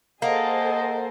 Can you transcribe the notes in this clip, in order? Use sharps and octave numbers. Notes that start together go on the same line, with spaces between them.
A#3 G#4 A4 C5 D#5 F#5